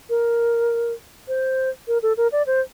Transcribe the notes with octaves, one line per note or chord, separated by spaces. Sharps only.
A#4
C5
A#4
A4
A#4
D5
C5